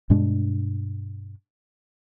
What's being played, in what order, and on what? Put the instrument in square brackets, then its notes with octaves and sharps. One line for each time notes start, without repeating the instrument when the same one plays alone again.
[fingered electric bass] G2 B2 G#3 D4